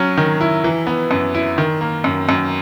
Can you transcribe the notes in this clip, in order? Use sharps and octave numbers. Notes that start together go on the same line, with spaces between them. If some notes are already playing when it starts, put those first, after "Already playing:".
Already playing: F#3 C#4
D#3
E4
E3
B3
F#2
E4
D#3
A#3
F#2
F#2